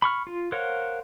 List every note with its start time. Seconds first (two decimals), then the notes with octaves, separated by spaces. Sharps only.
0.02 B5 C#6 F6
0.27 F4
0.52 A#4 C5 C#5 F5 F#5